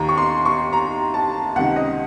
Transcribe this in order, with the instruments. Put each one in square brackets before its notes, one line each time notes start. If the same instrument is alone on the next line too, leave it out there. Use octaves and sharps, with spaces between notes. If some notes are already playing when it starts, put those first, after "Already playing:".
Already playing: [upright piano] D#2 D#3 A#5
C#6
C6
C#6
A#5
A5
C#2 C3 D#3 F#5
D#5